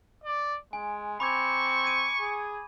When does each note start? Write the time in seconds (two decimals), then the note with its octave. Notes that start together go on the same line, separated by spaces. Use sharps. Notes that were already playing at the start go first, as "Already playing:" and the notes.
0.24 D5
0.73 G#3 G#5
1.20 C4 B5 C#6 D6 G#6
1.84 G#6 D#7
2.20 G#4